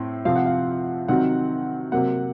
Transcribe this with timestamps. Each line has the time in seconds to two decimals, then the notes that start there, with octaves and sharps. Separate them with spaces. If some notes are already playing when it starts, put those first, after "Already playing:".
Already playing: A2 C4
0.25 C3 F3 C4 F5
0.36 F#5
0.46 F5
1.08 C3 D#3 F#3 C4 F#5
1.92 C3 F#3 A#3 F#5